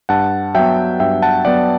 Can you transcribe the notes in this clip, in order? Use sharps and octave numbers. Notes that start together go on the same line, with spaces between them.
G2 F#5 A5
F#3 B3 E5 G5
G2 E5 G5
F#5 A5
F#3 B3 D5 F#5